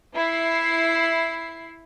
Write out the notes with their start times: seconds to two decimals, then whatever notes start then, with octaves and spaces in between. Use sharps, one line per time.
0.15 E4 C7